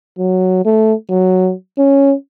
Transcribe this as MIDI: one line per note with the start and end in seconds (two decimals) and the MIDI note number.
0.18 0.63 54
0.65 0.94 57
1.09 1.52 54
1.78 2.14 61